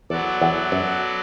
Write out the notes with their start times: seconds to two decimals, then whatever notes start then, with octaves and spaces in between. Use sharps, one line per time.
0.10 E2 F#3 B3 F#4 A4 D5
0.41 E2
0.72 F#2